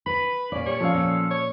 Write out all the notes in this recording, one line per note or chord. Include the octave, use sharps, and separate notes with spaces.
B4 B5
A#2 C#4 D5
G3 C#5
F3 C#4 A4 F5
A#2
C#5